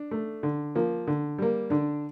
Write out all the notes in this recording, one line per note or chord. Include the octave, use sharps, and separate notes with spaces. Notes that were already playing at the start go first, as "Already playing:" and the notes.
Already playing: D4
A3
D3
F3 A#3
D3
G3 A#3
D3 D4